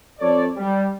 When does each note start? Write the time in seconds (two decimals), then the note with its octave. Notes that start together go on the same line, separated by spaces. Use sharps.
0.20 F2 A4 C#5 D5
0.57 G3